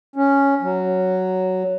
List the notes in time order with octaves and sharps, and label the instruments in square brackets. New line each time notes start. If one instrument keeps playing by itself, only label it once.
[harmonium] C#4
F#3